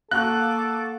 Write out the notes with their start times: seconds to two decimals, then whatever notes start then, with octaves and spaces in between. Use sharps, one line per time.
0.11 A#3 A4 F5 F#5 C#6 D6 F#6